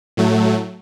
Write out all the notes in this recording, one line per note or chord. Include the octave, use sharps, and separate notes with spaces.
A2 F#3 A3